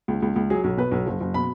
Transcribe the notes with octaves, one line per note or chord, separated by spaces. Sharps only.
C#2
C#2
C#2
F#3 G#4
B1
B2 B4
B1
F#1
F#1
B2 B5